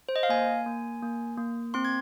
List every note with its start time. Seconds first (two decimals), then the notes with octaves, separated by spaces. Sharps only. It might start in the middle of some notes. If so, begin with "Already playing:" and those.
0.09 C5
0.16 D#5
0.23 F5
0.29 A#3 G#5
0.66 A#3
1.03 A#3
1.38 A#3
1.74 C4 C6
1.85 G#6